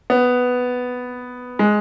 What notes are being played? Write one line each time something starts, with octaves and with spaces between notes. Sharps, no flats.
B3
G#3